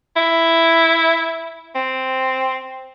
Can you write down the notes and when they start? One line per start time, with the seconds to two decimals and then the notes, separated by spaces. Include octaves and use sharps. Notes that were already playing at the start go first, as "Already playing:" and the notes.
0.17 E4
1.75 C4